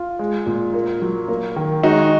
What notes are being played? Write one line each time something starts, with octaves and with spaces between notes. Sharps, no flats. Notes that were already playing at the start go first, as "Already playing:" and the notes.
Already playing: F4
G#3
A#2
A#3
F#3
A#3
D#3
G#3 D#4 F#4